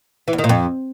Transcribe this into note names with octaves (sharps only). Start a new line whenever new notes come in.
E3
E2
D#3
A#2
F2